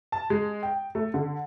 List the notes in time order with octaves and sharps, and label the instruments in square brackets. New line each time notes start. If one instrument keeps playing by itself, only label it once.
[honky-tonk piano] A5
G#3
G5
A3
D3